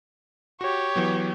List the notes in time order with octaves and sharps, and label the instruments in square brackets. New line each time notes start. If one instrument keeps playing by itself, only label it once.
[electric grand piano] F#4 [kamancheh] G4 C#5
[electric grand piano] E3 F#3 B3